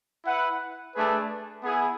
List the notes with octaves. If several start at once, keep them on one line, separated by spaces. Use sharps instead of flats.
E4 B4 F#5
A3 D4 G#4 B4
B3 E4 G#4